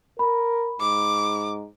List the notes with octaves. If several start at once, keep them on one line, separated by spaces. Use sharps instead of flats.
A#4 B5
G#2 D6